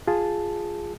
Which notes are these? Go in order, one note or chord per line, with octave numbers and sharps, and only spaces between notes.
F4 G#4 A5